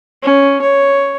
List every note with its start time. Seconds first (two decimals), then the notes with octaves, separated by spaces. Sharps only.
0.23 C#4
0.62 C#5